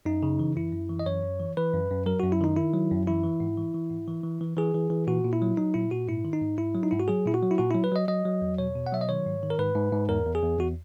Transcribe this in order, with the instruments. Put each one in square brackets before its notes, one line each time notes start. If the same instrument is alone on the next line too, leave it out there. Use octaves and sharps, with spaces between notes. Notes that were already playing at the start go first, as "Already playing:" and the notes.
[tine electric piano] F#2 D#4
C#3
E3
F#2 E4
F#2
E3
D#5
F#2 C#5
F#2
E3
E3 B4
F#2
F#2
F#3 A#4
F#2 F#4
E4
D#3 D#4
D#3 E4
F#3
F#2
E3 E4
E3
G#2
E3
E3
G#2
E3
E3
E3
E3 G#4
E3
E3
A#2 F#4
A#2
E4
F#3
F#3 D#4
A#2 E4
A#2 F#4
G#2 E4
D#3
D#4
G#2
G#2 E4
F#3
D#4
G#2 E4
F#4
F#3 G#4
A#2 E4
F#4
F#3
E4
A#2 F#4
F#3 E4
B4
F#3 D#5
F#3 D#5
F#3
E2
B2 C#5
B2
F#5
F#3 E5
D#5
D#3 C#5
G#2
D#3
A#4
G#2 B4
G#2
G#2
E2 A#4
E2
G#4
E2
E2 F#4